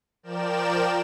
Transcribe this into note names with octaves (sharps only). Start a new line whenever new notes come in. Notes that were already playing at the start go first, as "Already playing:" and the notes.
F3 A#4 D5 G5 E7